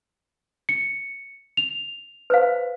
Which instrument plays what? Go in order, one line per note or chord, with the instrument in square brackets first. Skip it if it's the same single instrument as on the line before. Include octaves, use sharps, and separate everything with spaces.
[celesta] C#7
F7
[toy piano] B4 C5 F5